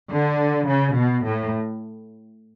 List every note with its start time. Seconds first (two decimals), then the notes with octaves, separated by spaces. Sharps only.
0.12 D3
0.69 C#3
0.97 B2
1.26 A2